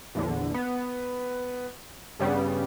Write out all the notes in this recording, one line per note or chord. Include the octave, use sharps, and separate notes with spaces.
A#1 E2 D3
B3
G2 C#3 G3 B3